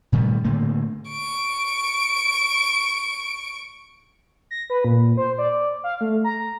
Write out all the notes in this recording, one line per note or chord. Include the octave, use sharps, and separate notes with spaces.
A#2 D#3 G3 A3
A2 D3 A3 A#3
C#6 D7
A#6
B4
A#2
C5
D5
F5
A3
A#5